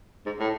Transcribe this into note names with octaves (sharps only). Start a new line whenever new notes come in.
G#2
A2